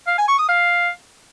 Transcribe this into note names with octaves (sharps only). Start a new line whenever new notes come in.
F5
G#5
C#6
D#6
F5